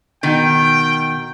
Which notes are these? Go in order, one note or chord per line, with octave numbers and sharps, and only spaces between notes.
B2 D#3 G5